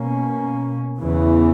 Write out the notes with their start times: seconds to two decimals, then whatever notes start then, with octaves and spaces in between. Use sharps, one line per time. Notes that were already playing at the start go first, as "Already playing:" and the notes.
Already playing: B2 A#3 C#4
1.00 E2 C#3 E3